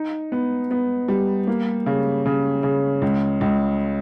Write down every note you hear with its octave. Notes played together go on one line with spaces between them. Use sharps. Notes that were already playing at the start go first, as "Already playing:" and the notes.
Already playing: D#4
B3
B3
G3
A#3
C#3
C#3
C#3
C#2
C#2